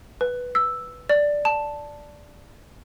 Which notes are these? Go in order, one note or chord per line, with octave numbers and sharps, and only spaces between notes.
B4
E6
D5
A5